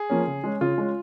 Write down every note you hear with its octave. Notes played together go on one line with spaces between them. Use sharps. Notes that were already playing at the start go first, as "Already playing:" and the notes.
Already playing: G#4
F3 A#3 C#4
C#3
G#3 C#4
C#3 F4
G#3 C#4